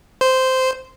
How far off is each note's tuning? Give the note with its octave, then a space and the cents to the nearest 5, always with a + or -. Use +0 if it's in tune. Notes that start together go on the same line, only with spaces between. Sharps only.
C5 -10